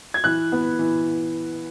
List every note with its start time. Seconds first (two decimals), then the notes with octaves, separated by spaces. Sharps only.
0.14 G#6
0.24 E3 F#6
0.52 B3
0.79 E3